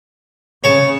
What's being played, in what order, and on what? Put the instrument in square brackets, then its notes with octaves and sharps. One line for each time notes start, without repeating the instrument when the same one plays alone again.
[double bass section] C#3 [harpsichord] C#5 A5